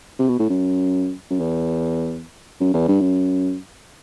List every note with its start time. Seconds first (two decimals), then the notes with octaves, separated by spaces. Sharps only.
0.19 C3
0.28 B2
0.39 A2
0.50 F#2
1.30 F#2
1.40 E2
2.60 F#2
2.74 E2
2.88 G2
3.01 F#2